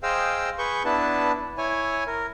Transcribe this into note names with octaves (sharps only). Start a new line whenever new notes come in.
G#4 C5 D#5 F5 G5 E6
G#4 B4 C#6 G6
B3 D4 E4 B4 A5
E4 C#5 G#5
A#4